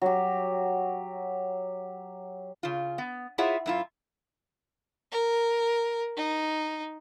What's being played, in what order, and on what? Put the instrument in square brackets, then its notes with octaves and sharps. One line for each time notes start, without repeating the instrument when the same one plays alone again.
[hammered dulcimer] F#3 G4
[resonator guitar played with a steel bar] C#3 F4
B3
E4 F4 G#4 C#5 E5 F#5
F#2 E4 F4
[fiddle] A#4
D#4